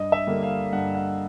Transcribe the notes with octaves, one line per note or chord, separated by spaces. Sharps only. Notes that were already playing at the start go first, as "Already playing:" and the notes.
Already playing: G2 D#5
E5
D3 G3 A#3
F5
G2 F#5
F#5